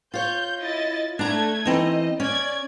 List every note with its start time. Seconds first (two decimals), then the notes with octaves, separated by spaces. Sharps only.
0.14 F4 C#5 G6
0.60 E4 D#5 A6
1.19 A3 D4 A#5 G#6
1.65 E3 C4 D#4 D#5
2.20 C#4 D5 G#6